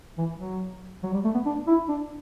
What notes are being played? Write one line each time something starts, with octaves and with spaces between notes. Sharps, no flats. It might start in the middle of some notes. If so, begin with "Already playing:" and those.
E3
F#3
F#3
G3
A3
B3
D4
E4
D4